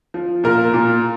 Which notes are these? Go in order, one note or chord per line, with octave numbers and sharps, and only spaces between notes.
F3
A#2 A#4
A#2